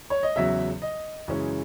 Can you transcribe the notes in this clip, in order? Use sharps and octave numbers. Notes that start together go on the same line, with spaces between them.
C#5
D#5
E2 C#3 F#3 E5
D#5
F#2 C#3 E3 G#3 C#4